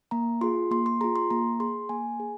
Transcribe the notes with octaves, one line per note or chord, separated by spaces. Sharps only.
A#3 A#5
F4 G#4 C6
A#3 C6
C6
F4 G#4 A#5
C6
A#3 A#5
G#4 C6
A#3 G#5
G#4